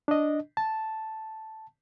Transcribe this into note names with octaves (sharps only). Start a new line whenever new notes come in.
D4 D#5
A5